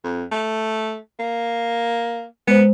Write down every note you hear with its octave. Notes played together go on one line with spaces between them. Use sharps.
F2
A3
A#3
G#3 B3 C5